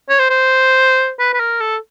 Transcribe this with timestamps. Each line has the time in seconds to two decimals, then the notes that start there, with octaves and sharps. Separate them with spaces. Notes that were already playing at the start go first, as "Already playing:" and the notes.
0.09 C#5
0.19 C5
0.30 C5
1.19 B4
1.33 B4
1.40 A#4
1.60 A4